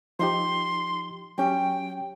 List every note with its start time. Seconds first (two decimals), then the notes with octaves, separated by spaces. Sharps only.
0.19 F3 D#4 G4 C6
1.38 F#3 C#4 G4 G5